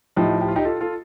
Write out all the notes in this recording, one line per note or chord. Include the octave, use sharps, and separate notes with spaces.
A2 F3 D#4 G4
G4
F4
D#4 G4
F4 A4
F4 A4